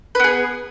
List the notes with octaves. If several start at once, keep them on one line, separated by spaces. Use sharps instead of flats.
B3 G#4 B4